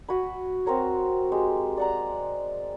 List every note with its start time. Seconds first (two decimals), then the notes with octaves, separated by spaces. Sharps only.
0.08 F#4 G#5 B5
0.66 C4 F#4 A#4 C#5
1.32 G#3 G4
1.77 D5 F#5 A#5